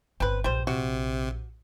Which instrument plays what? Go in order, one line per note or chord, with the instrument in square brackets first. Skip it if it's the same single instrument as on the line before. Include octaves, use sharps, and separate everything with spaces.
[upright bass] G1 [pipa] C4 B4
[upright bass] A#1 [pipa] G3 C5
[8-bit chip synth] C3 [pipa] F#4